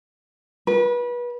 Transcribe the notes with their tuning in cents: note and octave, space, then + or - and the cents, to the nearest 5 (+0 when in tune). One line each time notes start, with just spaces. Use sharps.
B4 -30